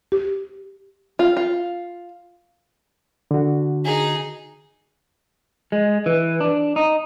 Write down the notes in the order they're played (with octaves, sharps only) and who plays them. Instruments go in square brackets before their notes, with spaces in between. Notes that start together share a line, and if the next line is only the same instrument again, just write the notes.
[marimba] G4
[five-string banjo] F4
F4
[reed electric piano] D3 F#4
[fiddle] D#4 G#4
[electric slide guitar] G#3
E3
D4
D#4